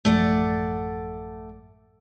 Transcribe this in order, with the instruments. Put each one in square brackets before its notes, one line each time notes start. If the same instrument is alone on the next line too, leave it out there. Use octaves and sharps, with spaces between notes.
[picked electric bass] A1 F#2 F3 [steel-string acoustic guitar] A3 D5 F#5